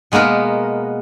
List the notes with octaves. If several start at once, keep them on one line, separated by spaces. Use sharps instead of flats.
B2 G#3 A#3 B3 A#4